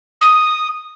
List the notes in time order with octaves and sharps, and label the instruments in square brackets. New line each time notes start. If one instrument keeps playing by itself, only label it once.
[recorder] D#6